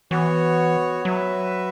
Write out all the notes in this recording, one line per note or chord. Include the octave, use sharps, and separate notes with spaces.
E3 B3 F#4 C#5
F#3 F#4 B4 E5